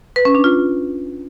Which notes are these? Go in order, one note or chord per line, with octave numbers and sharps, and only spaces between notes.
B4
C#4
D4
F4